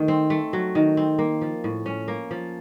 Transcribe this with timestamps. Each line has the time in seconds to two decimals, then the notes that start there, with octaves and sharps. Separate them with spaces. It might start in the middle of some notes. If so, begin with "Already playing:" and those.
Already playing: D#3 A3
0.08 C4
0.30 A3
0.53 F#3
0.75 D#3
0.97 C4
1.18 A#3
1.41 F3
1.64 A2
1.86 C#4
2.08 A#3
2.31 F3